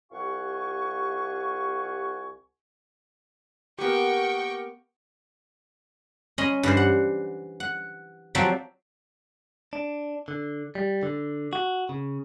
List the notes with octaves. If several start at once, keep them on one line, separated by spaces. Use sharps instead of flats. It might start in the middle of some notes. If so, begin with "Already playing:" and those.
C2 F4 G4 F#5 G#5 C#6
A#3 B3 G4 A#4 G5 C#6
C#4 D#5 B5 C6
G2 E3 C5
F#5
F#5
F3 F#3 C4 G4 D5 E5
D4
D3
G3
D3
F#4
C#3